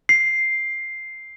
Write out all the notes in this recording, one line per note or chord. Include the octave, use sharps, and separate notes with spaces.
C7